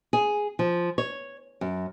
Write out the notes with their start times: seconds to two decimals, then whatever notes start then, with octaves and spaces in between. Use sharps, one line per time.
0.13 G#4
0.59 F3
0.98 C#5
1.61 F#2